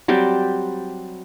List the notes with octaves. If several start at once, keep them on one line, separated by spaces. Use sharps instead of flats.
F#3 G3 C4 G4